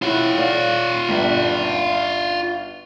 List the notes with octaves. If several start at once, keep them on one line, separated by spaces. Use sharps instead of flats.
E4 F4 C#5 F#5
C#5 D5 F5
G1 D4 B6